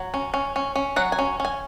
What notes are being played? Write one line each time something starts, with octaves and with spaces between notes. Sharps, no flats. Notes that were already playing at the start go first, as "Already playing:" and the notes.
Already playing: F#3
C#4
C#4
C#4
C#4
F#3 F#5
G#5
C#4
C#4 G#5